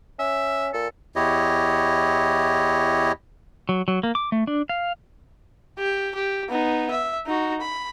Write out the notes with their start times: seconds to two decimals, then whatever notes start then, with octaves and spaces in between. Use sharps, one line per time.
0.19 C#4 E5
0.73 A#2 A4
1.16 E2 E4 G4 C#5 D#5
3.69 F#3
3.88 F#3
4.03 A#3
4.15 D6
4.32 A3
4.47 D4
4.69 F5
5.78 G4
6.15 G4
6.49 B3 D#4
6.91 E5
7.26 D#4 F#4
7.61 B5